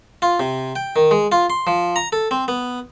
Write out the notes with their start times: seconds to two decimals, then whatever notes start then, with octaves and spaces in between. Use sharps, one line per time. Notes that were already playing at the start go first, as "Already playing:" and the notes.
0.22 F4
0.40 C3
0.76 G5
0.96 D#3
1.11 G#3
1.32 F4
1.50 C6
1.67 F3
1.96 A#5
2.12 A4
2.31 C4
2.48 B3